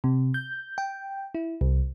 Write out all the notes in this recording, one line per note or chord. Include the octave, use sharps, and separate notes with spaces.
C3
G6
G5
E4
C2